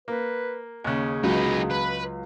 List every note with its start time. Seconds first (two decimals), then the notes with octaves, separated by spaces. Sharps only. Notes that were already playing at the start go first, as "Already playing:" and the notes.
0.08 A#3 B4
0.84 D#2 C#3 G#4
1.23 C#2 F#3 D#4 B4
1.70 B4